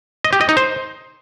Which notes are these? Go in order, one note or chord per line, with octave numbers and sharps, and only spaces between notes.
D#5
G4
D#5
D#4
C5